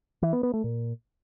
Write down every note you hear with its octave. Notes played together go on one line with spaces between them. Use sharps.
E3
B3
B3
A3
A#2